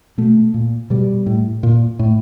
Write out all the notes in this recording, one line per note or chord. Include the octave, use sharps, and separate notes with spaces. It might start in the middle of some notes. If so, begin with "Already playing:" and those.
B2 A3
A#2
B2 G3
A2
A#2
A2